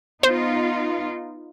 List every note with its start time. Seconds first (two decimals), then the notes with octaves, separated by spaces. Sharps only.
0.23 B3 D#4 F4 C5